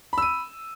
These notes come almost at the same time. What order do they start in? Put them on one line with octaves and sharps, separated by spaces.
B5 E6 D#7